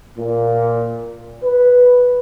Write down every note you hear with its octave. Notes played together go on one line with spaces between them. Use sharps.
A#2
B4